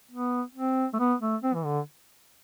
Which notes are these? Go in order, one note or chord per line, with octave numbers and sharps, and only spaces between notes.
B3
C4
A3
B3
A3
C4
E3
D3